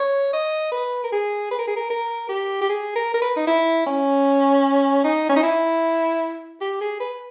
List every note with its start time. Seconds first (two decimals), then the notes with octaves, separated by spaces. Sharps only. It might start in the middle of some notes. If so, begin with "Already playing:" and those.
Already playing: C#5
0.33 D#5
0.72 B4
1.04 A#4
1.12 G#4
1.51 B4
1.59 A#4
1.67 G#4
1.76 A#4
1.90 A#4
2.29 G4
2.61 G4
2.69 G#4
2.95 A#4
3.14 A#4
3.22 B4
3.36 D#4
3.47 E4
3.86 C#4
5.04 D#4
5.29 C#4
5.36 D#4
5.43 E4
6.61 G4
6.81 G#4
7.00 B4